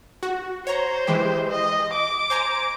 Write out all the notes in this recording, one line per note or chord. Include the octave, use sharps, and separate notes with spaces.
F#4
C5 C#5 A#5
E3 G#3 G4
D#5
D6
C5 G#5 A#5